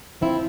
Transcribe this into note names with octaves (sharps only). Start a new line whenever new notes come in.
F3 C4 E4